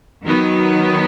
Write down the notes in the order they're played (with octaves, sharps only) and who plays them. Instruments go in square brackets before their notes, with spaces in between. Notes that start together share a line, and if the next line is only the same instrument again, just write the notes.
[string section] D#3 F#3 B3